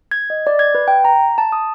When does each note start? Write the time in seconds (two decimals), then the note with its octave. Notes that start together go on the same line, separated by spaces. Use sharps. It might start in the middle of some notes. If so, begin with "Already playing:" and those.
0.11 G#6
0.30 D#5
0.47 D5
0.59 G#6
0.75 B4
0.88 G5
1.05 A#5
1.38 A5
1.52 D#6